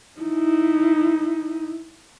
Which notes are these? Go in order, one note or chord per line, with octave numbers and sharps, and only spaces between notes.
D#4 E4